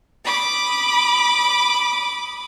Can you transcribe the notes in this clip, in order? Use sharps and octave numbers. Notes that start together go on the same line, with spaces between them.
B5 D6 D#6